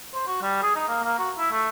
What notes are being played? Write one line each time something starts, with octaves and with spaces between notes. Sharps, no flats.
C5
F#4
G3
G#4
D#4
A#3
A#3
F#4
E4
A3